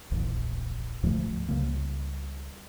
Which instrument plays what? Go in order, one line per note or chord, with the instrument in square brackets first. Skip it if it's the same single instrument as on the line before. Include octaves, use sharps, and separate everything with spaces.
[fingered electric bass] D1 A#1 E2
D2 G#2 F3 A3
C#2 C#3 G3 A#3